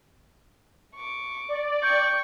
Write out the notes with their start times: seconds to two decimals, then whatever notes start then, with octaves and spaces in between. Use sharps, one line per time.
0.96 C#6 D6
1.49 D5
1.83 G5 C#6 G6